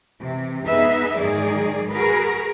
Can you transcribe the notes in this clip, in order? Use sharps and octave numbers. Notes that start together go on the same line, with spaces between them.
C3 E3
B3 D#4 G#4 B4 E5
G#2 D#3 F#3 D#4 G#4 D5
F#4 G#4 A#4 B4